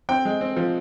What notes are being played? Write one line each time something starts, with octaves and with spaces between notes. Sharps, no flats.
C4 G5
G#3
C4
F3